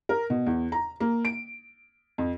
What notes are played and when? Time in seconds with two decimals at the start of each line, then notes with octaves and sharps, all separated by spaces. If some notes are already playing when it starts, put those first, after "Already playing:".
0.09 A#4
0.30 B2
0.46 E2
0.72 A#5
1.00 A#3
1.25 D7
2.18 F2